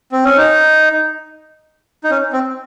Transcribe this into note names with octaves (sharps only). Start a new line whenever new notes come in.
C4
C#4
D#4
D#4
C#4
C4